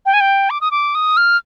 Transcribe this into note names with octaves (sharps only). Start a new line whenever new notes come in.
G5
G#5
G5
D6
D#6
D6
D#6
F6